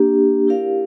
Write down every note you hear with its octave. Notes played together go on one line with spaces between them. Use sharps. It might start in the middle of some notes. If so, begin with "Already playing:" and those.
Already playing: A#3 D4 G4
E4 G4 A#4 D5 F5